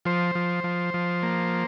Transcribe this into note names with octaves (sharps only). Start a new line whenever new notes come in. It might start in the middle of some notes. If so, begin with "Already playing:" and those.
F3 C5
F3
F3
F3
A#3